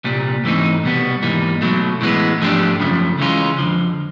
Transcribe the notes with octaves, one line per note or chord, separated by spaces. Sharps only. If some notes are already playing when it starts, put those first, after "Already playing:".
C2 A#2 G3
G#2 E3 A3 C4 D#4
C2 B2 G3 B3
G#2 E3 G3 A#3 D#4
B2 F#3 A3
A2 E3 G#3 B3
G#2 F3 A3 D4 G4
F#2 C#3 F3 A3
C#3 E3 G#3 C#4 F4
F2 D3 F3